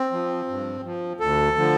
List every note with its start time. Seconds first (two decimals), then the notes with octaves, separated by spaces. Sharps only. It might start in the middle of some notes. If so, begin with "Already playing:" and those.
Already playing: C4
0.12 F3
0.48 G2
0.84 F3
1.20 D2 A4
1.56 D3 F3